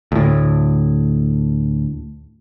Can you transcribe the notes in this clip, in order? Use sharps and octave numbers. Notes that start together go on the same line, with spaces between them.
D2 A2